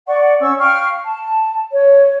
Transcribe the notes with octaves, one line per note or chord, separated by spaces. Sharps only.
D5 F#5 C#6
C#4 C#6 E6
F5 G5 C#6 F6
A5
C#5